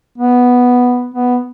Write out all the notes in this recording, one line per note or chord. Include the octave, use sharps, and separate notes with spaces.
B3
B3